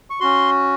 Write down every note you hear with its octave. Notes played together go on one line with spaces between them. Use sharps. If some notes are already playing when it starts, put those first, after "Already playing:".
C#6
C#4 F#4 C6